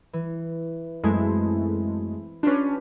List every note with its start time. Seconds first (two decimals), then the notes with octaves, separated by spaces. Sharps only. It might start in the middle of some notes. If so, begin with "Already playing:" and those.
0.13 E3
1.04 F#2 G#3 A3 C4 E4
2.43 C#4 D4 F4 G4 B4